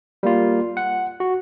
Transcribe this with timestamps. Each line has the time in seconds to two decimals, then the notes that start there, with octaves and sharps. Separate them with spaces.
0.23 G3 A#3 F4
0.77 F#5
1.20 F#4